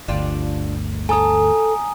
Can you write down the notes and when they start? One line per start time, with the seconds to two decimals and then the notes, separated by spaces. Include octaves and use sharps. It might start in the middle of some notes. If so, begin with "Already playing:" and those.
0.08 G1 D2 D4 F4 G4
1.09 A4 C#5 G#5 A#5 D#6